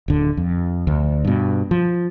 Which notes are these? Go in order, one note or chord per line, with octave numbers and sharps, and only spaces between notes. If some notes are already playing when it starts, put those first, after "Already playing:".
D1 D3
F2
D2
G2 B2
F3